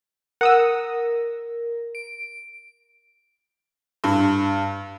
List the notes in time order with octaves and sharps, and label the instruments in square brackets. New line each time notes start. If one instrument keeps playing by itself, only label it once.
[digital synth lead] A#4 [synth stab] F#5 D#6 E6
[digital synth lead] D7
[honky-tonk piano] G2